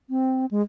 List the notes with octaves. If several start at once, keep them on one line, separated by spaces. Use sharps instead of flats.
C4
G#3